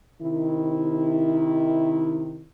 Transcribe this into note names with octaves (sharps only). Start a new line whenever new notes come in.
C3 D#3 E4